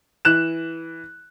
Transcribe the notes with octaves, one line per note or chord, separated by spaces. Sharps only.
E3 F#6 E7